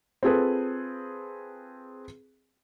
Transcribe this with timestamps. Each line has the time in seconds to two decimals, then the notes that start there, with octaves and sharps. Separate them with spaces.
0.23 C4 F4 G#4 A4 B4